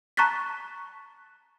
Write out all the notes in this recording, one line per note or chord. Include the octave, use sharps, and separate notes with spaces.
A5 A#5 C#6 F#6 A6 B6